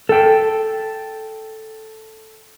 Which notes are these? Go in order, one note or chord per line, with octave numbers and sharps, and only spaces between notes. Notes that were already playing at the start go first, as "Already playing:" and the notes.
A4 G5